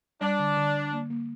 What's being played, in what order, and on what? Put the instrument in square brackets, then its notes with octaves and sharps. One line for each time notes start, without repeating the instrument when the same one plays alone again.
[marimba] G3 [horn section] D4
[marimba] D3
D3
D3
A#3
A#3